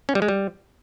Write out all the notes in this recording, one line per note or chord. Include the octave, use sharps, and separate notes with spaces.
C#4
G3
G#3
G3